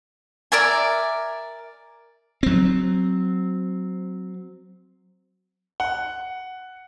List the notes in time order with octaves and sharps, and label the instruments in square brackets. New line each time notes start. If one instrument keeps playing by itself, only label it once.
[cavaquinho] A#4 D5 E5 G#5
[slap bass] F#3 C4
[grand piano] F#5